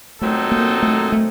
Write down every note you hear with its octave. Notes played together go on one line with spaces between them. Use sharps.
A#2 F#3 A3 C4 D#4 A4
A#3
A3
A3